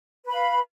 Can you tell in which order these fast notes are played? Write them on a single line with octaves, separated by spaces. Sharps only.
B4 B5 F5